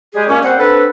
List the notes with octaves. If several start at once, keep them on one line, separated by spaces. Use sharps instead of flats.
G3 G#3 G4 G#4
A#2 A#3 C#4
G3 C4 C5 F#5
C4 D4 A4 B4